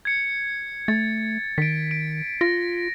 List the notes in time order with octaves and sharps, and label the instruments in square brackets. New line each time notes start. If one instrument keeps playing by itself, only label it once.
[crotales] G#6 C#7
[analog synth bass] A3 [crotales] A6
[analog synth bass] D#3 [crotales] B6 D7
[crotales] D7
[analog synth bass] F4 [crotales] A#6